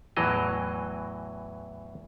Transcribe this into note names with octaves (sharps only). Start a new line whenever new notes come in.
E2 A2 E3 F#3 D#5